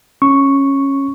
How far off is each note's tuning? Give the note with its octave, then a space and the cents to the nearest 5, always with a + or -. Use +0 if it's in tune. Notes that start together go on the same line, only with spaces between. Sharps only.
C#4 -15 C#6 +0